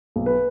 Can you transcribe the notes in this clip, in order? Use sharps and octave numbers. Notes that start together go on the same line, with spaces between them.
B1
B4